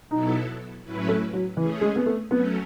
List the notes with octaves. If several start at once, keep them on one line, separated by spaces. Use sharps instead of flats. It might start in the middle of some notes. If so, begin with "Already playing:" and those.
B2 F#3 B3 D#4 E4 A4
A2 F#3 C#4 E4 B4
A3
F#3
E3 A3 C#4 G#4
G#3
B3
A3
F#3 A3 B3 C#4